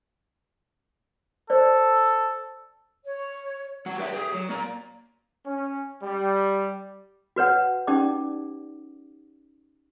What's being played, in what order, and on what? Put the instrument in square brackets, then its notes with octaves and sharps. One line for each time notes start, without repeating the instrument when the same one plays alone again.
[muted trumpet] A4 [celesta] C5 D5
[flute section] C#5
[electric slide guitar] G3 F#4 F#5
G4 B4 D5 E5
G4 G#4
F#3
A#3 D5 A#5
[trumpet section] C#4
G3
[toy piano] F#4 B4 C#5 F#5
C#4 D#4 G4 D5 D6